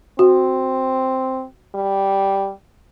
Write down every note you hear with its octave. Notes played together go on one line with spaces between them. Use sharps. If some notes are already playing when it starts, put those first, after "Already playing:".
C4 F#4
G3